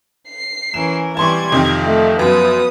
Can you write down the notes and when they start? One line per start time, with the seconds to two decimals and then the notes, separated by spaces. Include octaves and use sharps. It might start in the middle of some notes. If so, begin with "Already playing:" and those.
0.28 C7
0.74 E3 C#4 A#4 E7
1.17 E3 G3 C4 A5 C6 C#6 G#6
1.52 F2 C3 D#3 F3
1.85 A3
2.19 F#2 B3 D#6